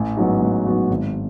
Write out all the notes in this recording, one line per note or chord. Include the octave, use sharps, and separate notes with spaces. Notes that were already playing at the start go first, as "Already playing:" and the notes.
Already playing: A1
G#2 F#3 B3 F#4
A1
G#2 F#3 B3 F#4
G#1